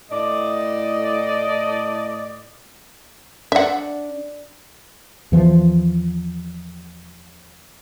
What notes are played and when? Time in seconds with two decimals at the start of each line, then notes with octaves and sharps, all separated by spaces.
0.11 A2 D5 D#5
3.52 D4 E5 F#5
5.32 E2 E3 F3